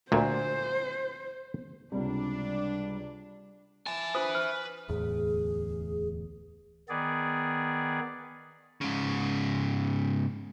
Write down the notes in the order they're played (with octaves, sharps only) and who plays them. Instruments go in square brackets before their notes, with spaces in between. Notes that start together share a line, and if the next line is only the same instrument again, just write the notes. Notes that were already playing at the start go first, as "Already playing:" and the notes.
[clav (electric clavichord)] D2 A#2 [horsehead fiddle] C5
[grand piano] C#2 C3 [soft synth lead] G3 [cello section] D4
[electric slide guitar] E5 G#5 [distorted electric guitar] A5
[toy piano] D4 F4 C5 [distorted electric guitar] B4 [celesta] D#6
[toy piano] C5 C#6 [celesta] F6
[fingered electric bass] D1 E2 A2 [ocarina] G#4
[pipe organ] D#3 B3 G#4 D5
[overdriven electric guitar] G#2 C#3